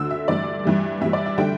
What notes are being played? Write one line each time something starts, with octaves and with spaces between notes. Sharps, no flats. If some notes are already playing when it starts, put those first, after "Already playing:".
Already playing: D2 D3 A3 E6
E5
G2 E3 A3 D5
G2 E3 G3
G2 E3 G3 E5
D5
E5
D3 G3 G5